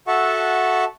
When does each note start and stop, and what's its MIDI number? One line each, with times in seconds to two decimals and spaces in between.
0.07 0.84 66
0.07 0.84 69
0.07 0.84 76
0.07 0.84 78
0.07 0.84 81
0.07 0.84 85